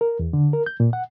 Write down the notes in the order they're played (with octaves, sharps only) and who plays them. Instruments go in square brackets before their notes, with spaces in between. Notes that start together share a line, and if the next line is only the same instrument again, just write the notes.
[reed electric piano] A#4
E2
D3
A#4
G6
A#2
F#5